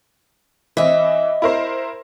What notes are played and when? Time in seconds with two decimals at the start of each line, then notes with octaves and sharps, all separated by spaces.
0.77 E3 C4 D#5 E5
1.42 E4 A#4 C5